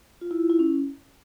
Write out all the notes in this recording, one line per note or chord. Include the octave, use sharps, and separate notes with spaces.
F4
E4
F4
E4
C#4